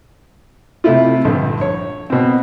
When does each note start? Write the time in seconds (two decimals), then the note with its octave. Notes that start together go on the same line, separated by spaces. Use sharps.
0.84 C3 A3 E4 F4
1.25 A#1 G2 D3
1.61 C#5
2.10 B2 C4